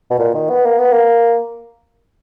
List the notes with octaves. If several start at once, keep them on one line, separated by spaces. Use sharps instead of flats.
B2
A#2
D#3
B3
A#3
B3
A#3